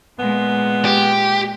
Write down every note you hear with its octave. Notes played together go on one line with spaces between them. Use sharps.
A#2 G#3 B3
G4